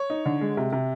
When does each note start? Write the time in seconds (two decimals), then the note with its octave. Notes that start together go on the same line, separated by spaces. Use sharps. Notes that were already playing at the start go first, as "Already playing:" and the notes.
Already playing: C#5
0.10 D#4
0.26 D3
0.41 G#3
0.57 C3
0.73 C3